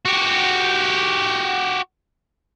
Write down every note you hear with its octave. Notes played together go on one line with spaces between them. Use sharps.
F#4 G4